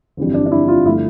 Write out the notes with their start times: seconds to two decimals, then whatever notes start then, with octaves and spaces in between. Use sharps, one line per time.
0.17 G1 F2 E3 G3
0.34 D4
0.46 D4
0.51 E4
0.68 F4
0.85 G1 F3 A3 E4